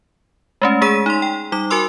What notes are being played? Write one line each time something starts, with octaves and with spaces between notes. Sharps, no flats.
G#3 A3 C#4
G#3 G#4 B6 D#7
D#4 C6
G5
G3 D#4 D6
F#4 A#4 G#5 C6 E6